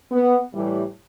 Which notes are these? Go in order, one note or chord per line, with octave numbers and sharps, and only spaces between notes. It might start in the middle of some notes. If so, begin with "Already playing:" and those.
B3
A2 E3 G3